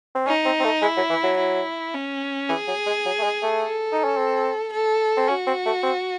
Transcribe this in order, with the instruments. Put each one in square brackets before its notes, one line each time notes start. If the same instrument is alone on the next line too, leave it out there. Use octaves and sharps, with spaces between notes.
[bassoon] C4
[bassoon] C#4 [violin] D#4
[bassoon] C4
C4
A3
[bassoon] G#3 [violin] E4
[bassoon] F#3
E3
F#3
[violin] E4
C#4
[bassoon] E3 [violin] G#4
[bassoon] F#3
G#3
F#3
A3
G#3
A3
[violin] A4
[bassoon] D#4
C#4
C4
[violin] A4
[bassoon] C4
[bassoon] C#4 [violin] F#4
[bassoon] C4
A3
C4